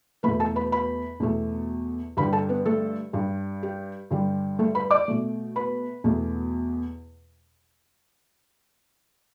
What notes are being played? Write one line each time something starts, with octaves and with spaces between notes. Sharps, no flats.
E2 B2 A3 B4 B5
A4 A5
B4 B5
B4 B5
E2 B2 A3
G2 D3 G3 B4 B5
A4 A5
B3 B4
A3 A4
G2 G3
G4
G2 D3 G3
A3 A4
B4 B5
D5 D6
B2 A3
B4 B5
E2 B2 A3